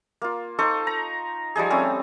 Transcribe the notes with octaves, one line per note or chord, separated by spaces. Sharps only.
A#3 F4
D#4 A4 C5 C#6
A#5
F3 G3 D#4 G#4
G3 A3 C4 C#4